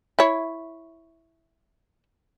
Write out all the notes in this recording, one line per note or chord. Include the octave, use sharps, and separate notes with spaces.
E4 C#5